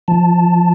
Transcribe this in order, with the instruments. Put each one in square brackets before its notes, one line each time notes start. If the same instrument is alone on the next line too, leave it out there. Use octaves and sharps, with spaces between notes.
[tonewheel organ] F3 A5